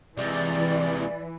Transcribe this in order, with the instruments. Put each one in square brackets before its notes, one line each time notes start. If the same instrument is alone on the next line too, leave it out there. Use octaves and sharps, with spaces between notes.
[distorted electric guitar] C3 G#3 [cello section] E3 [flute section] D5